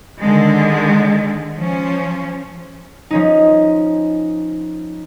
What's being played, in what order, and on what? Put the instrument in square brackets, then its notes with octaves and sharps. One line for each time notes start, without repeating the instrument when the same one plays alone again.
[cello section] D3 D#3 G#3
F3 C#4
[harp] F3 C#4 D#4